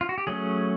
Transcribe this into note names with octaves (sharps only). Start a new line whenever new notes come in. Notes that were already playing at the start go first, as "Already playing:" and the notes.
F4
F#4
G4
F#3 A3 C#4 G#4